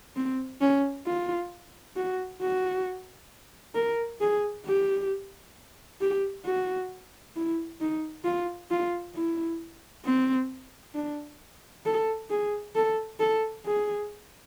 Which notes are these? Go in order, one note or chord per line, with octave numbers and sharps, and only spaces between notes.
C4
C#4
F4
F#4
F#4
A#4
G#4
G4
G4
F#4
E4
D#4
F4
F4
E4
C4
D4
A4
G#4
A4
A4
G#4